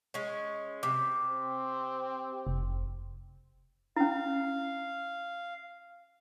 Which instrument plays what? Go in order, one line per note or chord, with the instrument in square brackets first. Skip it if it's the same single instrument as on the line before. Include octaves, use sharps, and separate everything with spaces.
[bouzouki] G#3 C#4
[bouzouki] C3 [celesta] D6
[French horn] C4
[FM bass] F1
[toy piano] C#4 E4 [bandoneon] F5